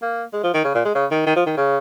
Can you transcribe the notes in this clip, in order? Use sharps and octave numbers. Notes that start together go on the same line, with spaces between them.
A#3
G#3
F3
D#3
C#3
A#2
G#3
C#3
D#3
D#3
F3
D#3
C#3